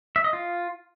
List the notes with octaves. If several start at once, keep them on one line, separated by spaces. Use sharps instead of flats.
E5
D#5
F4